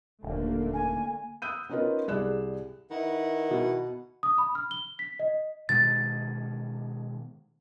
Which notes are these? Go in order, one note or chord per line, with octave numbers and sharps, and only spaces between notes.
D#1 D3 A3 A#3
G#5
D#6 E6 F#6 G6 D#7
B3 C#4 D#4 F4 A#4 B4
C2 G#4 D5 F#6 E7
D#3 E4 B4 F#5
B2
D#6
B5
F6
G7
B6
D#5
B2 D#3 G#3 A6